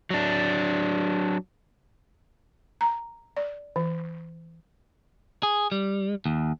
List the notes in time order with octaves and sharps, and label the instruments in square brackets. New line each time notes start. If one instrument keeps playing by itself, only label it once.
[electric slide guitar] F#3 D4
[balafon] A#5
D5
E3
[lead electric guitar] G#4
G3
D#2